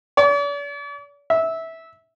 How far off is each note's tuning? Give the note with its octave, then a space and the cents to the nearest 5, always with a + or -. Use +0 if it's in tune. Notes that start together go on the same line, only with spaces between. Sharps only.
D5 -45
E5 -15